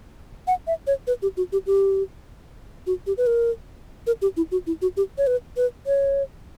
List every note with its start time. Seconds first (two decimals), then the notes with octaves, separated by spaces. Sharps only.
0.47 F#5
0.67 E5
0.87 C#5
1.07 B4
1.22 G4
1.37 F#4
1.52 G4
1.67 G4
2.87 F#4
3.07 G4
3.18 B4
3.27 A#4
4.07 A#4
4.22 G4
4.37 E4
4.52 F#4
4.67 E4
4.82 F#4
4.97 G4
5.18 C#5
5.27 B4
5.57 B4
5.87 C#5